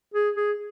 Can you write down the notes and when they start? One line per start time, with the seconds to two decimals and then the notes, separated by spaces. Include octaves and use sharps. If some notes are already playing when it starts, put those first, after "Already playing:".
0.14 G#4
0.36 G#4